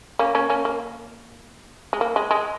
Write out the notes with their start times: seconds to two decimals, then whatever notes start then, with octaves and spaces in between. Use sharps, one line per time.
0.19 A#3 C#4
0.35 A#3 C#4
0.50 A#3 C#4
0.65 A#3
1.93 G#3
2.01 A#3
2.16 G#3
2.31 G#3